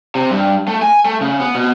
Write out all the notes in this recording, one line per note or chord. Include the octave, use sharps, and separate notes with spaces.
C3
G2
A3
G#5
A3
C#3
B3
B2